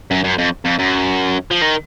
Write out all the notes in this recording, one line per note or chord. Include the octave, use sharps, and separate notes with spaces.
F#2
F#2
F2
F2
F#2
F3
D#3